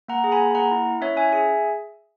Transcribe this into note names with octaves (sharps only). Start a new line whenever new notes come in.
A#3 F#5 A#5
G#4
G#5 B5
A#3
A#3 F#5 A#5
E4
E4
C#4 C#5 E5
C#4 E5 G#5
G#4 E5 G#5